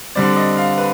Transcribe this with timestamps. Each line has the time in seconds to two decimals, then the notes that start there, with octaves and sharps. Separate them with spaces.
0.15 D3 G3 C4 D5
0.36 D#5
0.57 F5
0.78 B4